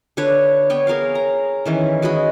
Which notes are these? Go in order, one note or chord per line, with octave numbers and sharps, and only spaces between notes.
D3 D4 B4 C#5
B3 C#5 G5
G#4 A#4 C#5 F5
A#5
D#3 E3 C#4
G#3 F#4 D#5 B5